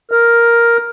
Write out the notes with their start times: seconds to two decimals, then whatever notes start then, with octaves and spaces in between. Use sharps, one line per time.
0.12 A#4